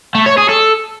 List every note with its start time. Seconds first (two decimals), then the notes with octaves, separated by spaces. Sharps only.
0.15 A3
0.26 C#5
0.38 G#4
0.49 A4